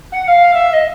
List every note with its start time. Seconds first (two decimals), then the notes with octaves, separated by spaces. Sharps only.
0.12 F#5
0.24 F#5
0.27 F5
0.53 E5
0.73 D#5